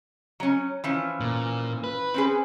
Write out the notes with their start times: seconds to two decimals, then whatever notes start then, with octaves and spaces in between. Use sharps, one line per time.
0.40 F#3 C#4
0.84 E3 F3 C#4
1.20 A#2
1.84 B4
2.14 C4 C#4 G#4